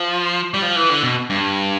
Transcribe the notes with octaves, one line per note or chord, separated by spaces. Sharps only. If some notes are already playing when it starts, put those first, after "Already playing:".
Already playing: F3
G3
F3
E3
D3
B2
G2